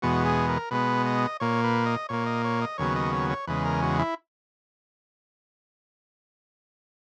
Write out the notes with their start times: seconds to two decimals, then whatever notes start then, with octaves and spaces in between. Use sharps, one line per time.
0.02 E2 B2 G#3 B3 F#4
0.25 G#4
0.49 A#4
0.71 B2 G#3 B3 B4
1.06 D#5
1.40 A#2 A#3 C#5
1.64 B4
1.86 D#5
2.09 A#2 A#3 C#5
2.26 D#5
2.44 C#5
2.62 D#5
2.78 D#2 C#3 F#3 B3 C#5
2.96 D#5
3.14 C#5
3.30 C#5
3.47 E2 C#3 G#3 B4
3.65 A#4
3.83 F#4
3.99 E4